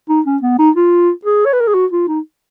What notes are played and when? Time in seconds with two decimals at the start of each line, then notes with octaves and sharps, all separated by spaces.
0.09 D#4
0.26 C#4
0.42 B3
0.59 D#4
0.76 F4
1.25 G#4
1.45 C#5
1.53 B4
1.61 A#4
1.67 G#4
1.74 F#4
1.92 F4
2.08 D#4